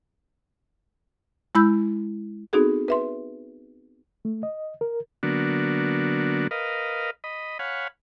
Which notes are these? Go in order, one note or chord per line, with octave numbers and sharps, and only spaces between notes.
G#3 E4 B5 E6 G6
B3 C4 D#4 F#4 G#4 A4
B4 E5 C6
A3
D#5
A#4
D3 F#3 A#3 B3 D4 F#4
A#4 B4 D#5 F5
D#5 B5
C#5 F5 F#5 G#5 B5